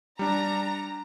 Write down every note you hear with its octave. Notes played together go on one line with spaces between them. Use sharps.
G3 D4 A#5